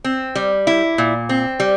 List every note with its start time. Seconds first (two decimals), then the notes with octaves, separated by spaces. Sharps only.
0.04 C4
0.35 G3
0.67 E4
0.98 A#2
1.29 C4
1.60 G3